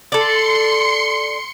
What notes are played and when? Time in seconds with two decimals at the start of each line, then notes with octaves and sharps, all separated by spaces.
0.12 A4 D5 C6 C#7